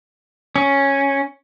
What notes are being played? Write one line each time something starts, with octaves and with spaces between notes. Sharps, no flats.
C#4